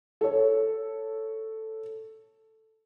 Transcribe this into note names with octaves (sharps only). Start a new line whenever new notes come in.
A4 C#5